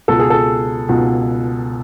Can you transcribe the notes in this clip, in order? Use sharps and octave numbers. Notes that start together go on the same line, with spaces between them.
C#2 B2 A4
G#4
A4
C#2 B2